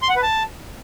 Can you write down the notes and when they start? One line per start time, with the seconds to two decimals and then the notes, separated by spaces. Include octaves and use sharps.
0.02 C6
0.09 F#5
0.16 B4
0.23 A5